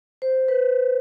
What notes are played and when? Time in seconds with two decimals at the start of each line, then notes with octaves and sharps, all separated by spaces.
0.22 C5
0.48 B4